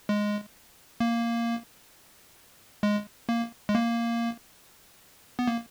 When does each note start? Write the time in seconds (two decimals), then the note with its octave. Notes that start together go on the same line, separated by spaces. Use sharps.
0.09 G#3
1.00 A#3
2.83 G#3
3.29 A#3
3.69 G#3
3.75 A#3
5.39 B3
5.47 A#3